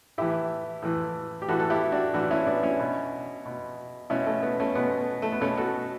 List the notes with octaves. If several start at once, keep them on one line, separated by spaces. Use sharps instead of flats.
A2 E3 E4 G4
A2 E3
G4
A2 E3 F#4 A4
A4
E4 G4
D4 F#4
A2 E3 D4 F#4
C#4 E4
B3 D4
C#4 E4
B2
B2
B2 C#4 E4
A3 C#4
B3
A3 C#4
B2 B3
A3
B3
B2 A3 C#4
F#4 A4